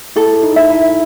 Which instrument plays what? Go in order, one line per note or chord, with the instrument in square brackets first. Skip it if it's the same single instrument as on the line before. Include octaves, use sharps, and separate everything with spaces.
[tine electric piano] E4 [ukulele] A4
[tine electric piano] D#4
[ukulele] E5
[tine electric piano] E4